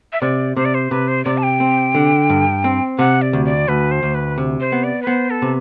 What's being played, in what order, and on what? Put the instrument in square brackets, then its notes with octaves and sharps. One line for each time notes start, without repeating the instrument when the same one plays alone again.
[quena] E5
[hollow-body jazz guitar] C3 [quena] D5
[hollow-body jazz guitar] C3 [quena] C5
[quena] D5
C5
[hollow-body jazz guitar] C3 [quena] B4
[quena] C5
[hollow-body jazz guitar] C3 [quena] D5
[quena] A5
G5
[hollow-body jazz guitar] C4
D3
G2
C4
[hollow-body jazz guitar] C3 [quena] F#5
[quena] D5
[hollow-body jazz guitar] D2
[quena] D5
[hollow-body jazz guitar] D2 [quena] B4
[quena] C5
[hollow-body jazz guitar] D2
[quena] B4
[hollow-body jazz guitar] C3
[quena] C5
[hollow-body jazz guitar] B3
[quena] D5
B4
[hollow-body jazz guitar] B3 [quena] C5
[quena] A4
[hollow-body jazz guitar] C3